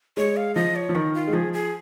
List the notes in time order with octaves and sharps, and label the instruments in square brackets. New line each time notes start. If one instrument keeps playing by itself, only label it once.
[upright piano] G#3 [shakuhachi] C#5
[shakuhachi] F5
[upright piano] F3 [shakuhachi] D#5
[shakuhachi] C#5
[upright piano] F3
[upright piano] D#3 [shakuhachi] A#4
[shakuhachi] F4
[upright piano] G#3
[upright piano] F3 [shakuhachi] G#4
[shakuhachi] G#4